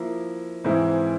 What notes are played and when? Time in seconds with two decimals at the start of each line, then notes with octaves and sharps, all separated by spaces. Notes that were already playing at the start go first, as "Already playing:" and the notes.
Already playing: F3 A#3 E4
0.64 G#2 E3 G#3 C4 E4